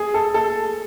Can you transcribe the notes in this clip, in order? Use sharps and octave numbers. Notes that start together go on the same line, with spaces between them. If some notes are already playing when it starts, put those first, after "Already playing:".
Already playing: G#4
A4
A4